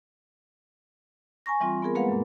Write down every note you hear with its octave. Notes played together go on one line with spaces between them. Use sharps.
G#5 A#5 C#6 A#6
E3 G3 C4 F4
B3 F4 G#4 A#4
G#3 A#3 B4 F5 F#5
F#2 A#2